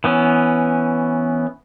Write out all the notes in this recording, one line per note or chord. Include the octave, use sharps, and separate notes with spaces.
E3 B3 C#4